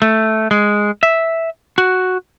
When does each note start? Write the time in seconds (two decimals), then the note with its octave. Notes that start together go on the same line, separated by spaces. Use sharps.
0.02 A3
0.51 G#3
1.03 E5
1.78 F#4